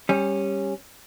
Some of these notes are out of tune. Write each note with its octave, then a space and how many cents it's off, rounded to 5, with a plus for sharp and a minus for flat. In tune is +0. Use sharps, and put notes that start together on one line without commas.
G3 +15 C#4 -10